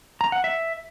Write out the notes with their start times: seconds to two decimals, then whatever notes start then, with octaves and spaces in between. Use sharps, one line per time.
0.21 A#5
0.32 F#5
0.44 E5